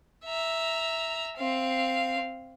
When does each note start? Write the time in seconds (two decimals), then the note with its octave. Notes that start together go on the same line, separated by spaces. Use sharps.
0.25 E5 A#5
1.37 C4 F5